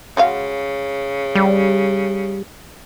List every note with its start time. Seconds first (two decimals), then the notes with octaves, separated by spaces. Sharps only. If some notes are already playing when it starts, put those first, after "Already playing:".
0.17 C#3 G#3 F#4 F5
1.35 G3